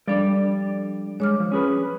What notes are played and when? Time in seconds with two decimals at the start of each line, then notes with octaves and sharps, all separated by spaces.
0.08 F3 G3 D4 A4 D5
1.20 G#3 C#5 D6 F6
1.40 F3
1.52 C#4 G#4 B4